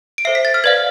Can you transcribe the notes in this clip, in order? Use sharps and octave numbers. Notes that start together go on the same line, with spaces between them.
D7
A4 C5 E5 C7
B6
A6
F6
B4 D5 F5 G#6